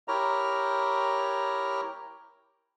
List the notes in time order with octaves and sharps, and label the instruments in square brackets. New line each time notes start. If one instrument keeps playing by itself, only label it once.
[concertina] E4 G4 A#4 C#5 A#5